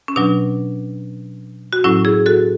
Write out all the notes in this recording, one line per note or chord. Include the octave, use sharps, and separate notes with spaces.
C#4
B2 F#3 D4
F#4
A2 F#3 C#4 E4
E4 G#4
F#4 A4